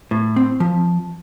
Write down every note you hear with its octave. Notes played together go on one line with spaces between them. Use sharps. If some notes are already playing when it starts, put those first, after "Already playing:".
A2
C4
F3